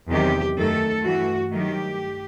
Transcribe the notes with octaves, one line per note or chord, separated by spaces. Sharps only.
E2 C3 D#3 F#3 G4
F#2 D#3 A3 A4
G2 E3 A3 F#4
G2 D#3 F#3 A3 G4